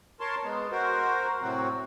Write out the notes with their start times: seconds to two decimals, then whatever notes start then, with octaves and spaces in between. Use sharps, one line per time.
0.20 A#4 C#5 A5 C6
0.44 G#3 B3
0.71 F#4 A#4 C5
1.41 A2 C3 F#3 C4 F#4